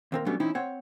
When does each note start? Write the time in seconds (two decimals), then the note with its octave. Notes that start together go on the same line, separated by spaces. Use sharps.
0.12 D#2 C4 A#4
0.26 F#3 G3 A3 B3 C#4 D4
0.40 E3 C4 C#4 D#4 E4
0.55 C4 C#5 F#5